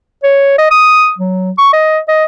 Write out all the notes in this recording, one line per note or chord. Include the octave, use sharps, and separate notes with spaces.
C#5
D#5
D#6
F#3
C#6
D#5
D#5